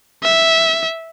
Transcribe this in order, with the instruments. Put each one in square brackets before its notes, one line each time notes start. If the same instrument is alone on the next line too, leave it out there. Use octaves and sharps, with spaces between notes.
[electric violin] E5